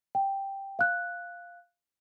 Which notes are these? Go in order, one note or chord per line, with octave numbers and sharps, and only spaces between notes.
G5
F5 F#6